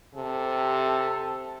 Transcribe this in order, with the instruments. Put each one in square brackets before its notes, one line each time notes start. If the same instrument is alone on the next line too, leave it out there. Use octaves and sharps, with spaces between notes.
[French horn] C3 [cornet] A4